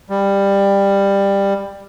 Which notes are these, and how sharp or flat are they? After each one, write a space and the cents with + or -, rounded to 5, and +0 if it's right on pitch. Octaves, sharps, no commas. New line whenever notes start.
G3 +15